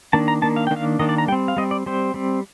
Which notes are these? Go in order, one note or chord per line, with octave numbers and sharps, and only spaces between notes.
D#3 A#3 D4 A5
A#5
D#3 A#3 D4 A5
F5
D#3 A#3 D4 G5
F5
D#3 A#3 D4 D#5
D5
A#5
G3 C4 G5
F5
G3 C4 D#5
D5
G3 C4 C5
G3 C4